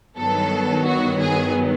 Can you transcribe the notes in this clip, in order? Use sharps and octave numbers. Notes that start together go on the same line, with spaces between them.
G2 D#3 F#3 B3 A4
F#4
G#4